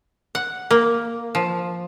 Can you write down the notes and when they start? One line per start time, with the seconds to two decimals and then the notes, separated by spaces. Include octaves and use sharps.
0.35 F#5
0.71 A#3
1.35 F3